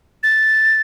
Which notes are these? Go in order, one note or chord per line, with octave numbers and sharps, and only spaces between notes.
A6